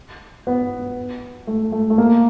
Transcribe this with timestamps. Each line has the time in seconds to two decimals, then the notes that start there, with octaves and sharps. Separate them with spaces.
0.47 B3
1.47 A3
1.72 A3
1.90 A3
1.98 A#3